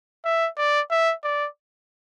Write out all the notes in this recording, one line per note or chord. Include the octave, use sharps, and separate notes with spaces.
E5
D5
E5
D5